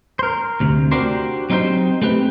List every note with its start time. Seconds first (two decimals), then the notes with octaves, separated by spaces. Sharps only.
0.19 A#4 C5
0.60 D2 C3
0.92 D4 F#4 G4 A#4 C5
1.50 F#3 C4 D#4 E4 G4 C5
2.02 A3 C4 G4 B4